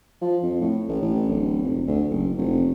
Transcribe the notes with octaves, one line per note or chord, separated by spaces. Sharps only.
F3
F2
A2
A1
A1
D1
F1
D2
F#1
F1